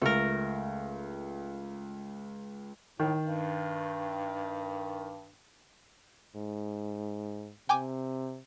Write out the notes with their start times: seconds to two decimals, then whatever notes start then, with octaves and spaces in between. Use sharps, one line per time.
0.02 C#2 A3 A#4
3.00 A2 D#3
3.23 G2
6.35 G#2
7.69 C3 G5 G#5 D6